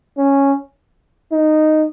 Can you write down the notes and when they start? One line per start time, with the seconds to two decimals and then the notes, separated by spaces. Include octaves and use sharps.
0.17 C#4
1.32 D#4